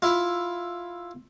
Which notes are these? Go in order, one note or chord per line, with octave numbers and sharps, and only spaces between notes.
E4 F4